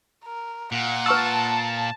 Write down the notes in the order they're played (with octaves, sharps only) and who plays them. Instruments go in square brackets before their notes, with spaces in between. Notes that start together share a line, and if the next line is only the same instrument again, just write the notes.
[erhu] A#4
[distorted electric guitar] A#2 [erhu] F#5
[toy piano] B4 C#6 E6 [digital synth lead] A5